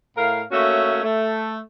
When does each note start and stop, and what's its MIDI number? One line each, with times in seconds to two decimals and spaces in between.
0.18 0.43 45
0.18 0.43 70
0.18 0.43 77
0.52 1.01 57
0.52 1.01 58
0.52 1.01 61
0.52 1.01 66
0.52 1.01 73
0.52 1.01 76
1.04 1.59 57